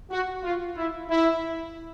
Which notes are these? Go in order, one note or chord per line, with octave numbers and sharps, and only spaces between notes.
F#4
F4
E4
E4